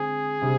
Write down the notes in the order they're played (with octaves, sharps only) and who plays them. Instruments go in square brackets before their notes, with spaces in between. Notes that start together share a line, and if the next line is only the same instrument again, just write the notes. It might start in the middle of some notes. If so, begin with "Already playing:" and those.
Already playing: [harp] D3 G#3 C4 [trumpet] G#4
[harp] C3 G3 D4